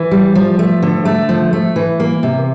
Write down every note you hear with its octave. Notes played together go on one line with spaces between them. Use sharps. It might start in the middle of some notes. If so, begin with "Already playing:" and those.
Already playing: E3
G3
F3
A3
D3
A3
F3
A3
E3
A#3
C3